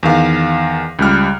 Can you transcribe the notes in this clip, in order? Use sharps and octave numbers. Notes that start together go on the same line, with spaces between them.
E2 D#3 F5
C#2 G3 F6